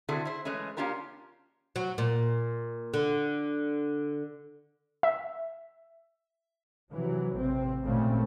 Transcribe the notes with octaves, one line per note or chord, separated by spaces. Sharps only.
D3 C4 E4 F#4 G#4 A4
E4 C5
E3 G#3 A3 C#4
A#3 C#4 D4 F4 G4 A#4
F#3
A#2
D3
E5
C3 E3 F#3
A1 C3 C4
G#1 A#2 C#3 A3 C4 C#4